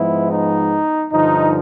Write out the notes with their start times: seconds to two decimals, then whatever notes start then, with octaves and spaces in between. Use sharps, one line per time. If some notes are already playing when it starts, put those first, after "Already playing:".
Already playing: G#2 F3 G#3 B3 E4
0.32 D#4
1.12 G2 D3 F3 D#4